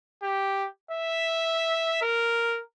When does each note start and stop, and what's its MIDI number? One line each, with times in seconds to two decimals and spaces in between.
0.22 0.67 67
0.91 1.99 76
2.02 2.60 70